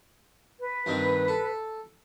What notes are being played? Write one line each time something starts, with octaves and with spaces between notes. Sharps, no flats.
B4
G2 D#3 C4
A4